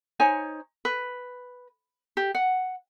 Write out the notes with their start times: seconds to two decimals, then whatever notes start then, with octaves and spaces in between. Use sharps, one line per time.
0.20 D#4 C5 C#5 G#5
0.85 B4
2.17 G4
2.35 F#5